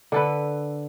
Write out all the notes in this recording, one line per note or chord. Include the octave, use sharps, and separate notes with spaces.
D3 A4 B4